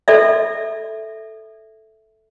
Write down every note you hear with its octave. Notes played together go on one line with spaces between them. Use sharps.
A4 D5 E5